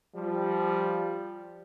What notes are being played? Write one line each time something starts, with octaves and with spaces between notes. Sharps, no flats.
F3 G3